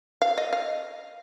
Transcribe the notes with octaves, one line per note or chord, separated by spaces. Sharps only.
F5
D#5
F5